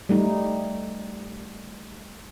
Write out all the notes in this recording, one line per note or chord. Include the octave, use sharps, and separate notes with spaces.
G3 A3 D#4